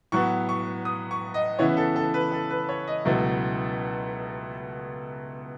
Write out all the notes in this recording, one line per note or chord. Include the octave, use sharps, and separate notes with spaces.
A2 F#3 B3 C#6
C#6
D#6
C#6
D#5
C#3 E3 B3 E4 C#5
A4
A4
B4
A4
B4
C#5
D#5
C#2 B2 F#3 A3 E4